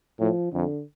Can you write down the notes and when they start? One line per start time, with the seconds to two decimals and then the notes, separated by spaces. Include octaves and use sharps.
0.20 A2 F3
0.52 F2 D3